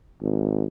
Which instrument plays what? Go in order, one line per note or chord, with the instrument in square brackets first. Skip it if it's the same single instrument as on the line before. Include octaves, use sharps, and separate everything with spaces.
[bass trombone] G#1